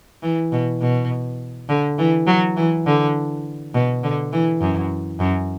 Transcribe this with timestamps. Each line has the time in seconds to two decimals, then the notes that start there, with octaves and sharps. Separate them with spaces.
0.23 E3
0.52 B2
0.81 B2
1.69 D3
1.99 E3
2.27 F#3
2.57 E3
2.86 D3
3.74 B2
4.03 D3
4.32 E3
4.61 F#2
5.20 F#2